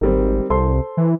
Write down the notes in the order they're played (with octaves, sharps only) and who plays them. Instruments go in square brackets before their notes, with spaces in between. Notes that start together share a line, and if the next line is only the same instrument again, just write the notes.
[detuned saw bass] G#1 [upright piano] D#3 G3 C4
[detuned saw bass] C2 [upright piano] A4 C5 C6
[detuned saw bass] E3